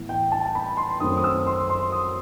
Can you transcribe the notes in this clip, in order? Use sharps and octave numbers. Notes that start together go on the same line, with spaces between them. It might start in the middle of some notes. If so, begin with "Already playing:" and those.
Already playing: A2 E3 B3
G5
A5
A5
B5
C6
F#2 D#3 A3 C4 D#6
D#6
E6
C6
C6
D#6